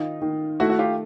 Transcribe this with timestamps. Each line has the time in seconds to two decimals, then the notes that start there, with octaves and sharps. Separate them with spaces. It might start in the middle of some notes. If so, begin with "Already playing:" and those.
Already playing: D#3 D#4 F4
0.22 D#3
0.60 A3 E4 F#4
0.70 F#4
0.79 F4 G4